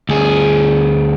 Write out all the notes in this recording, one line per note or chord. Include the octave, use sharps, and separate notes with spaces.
D2 G#4